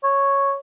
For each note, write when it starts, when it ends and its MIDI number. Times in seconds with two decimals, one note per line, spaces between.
0.03 0.56 73